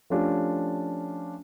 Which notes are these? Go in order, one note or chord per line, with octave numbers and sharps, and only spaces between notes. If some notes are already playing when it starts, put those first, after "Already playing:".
F3 A3 C#4 D4 F4 G4